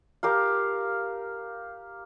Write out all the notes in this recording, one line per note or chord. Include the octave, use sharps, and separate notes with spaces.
G4 A#4 F5